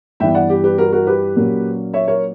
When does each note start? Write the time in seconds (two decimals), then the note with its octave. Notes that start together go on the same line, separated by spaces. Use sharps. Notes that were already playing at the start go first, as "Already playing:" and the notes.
0.20 G2 E3 B3 E5 G5
0.35 D5 F#5
0.50 G4
0.64 G4 B4
0.78 F#4 A#4
0.92 F#4 A#4
1.07 G4 B4
1.36 A#2 F#3 A#3 C#4
1.93 C#5 E5
2.07 A#4 C#5